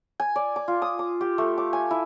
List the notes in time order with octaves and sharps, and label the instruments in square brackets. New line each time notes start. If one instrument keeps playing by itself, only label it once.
[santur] G#5
D5
D6
F4
D#6
D6
G4
A3
D6
G#5
E4